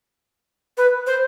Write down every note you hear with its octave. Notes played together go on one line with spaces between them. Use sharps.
B4
C5